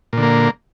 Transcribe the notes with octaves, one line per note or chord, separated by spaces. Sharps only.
A#2 D3 A#3